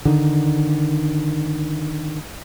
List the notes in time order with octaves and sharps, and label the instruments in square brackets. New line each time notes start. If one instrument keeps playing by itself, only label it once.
[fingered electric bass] D3 D#3